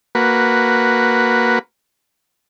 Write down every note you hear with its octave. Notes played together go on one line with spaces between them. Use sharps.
A#3 F#4 B4